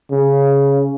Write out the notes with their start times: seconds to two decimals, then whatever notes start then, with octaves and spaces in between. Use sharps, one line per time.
0.11 C#3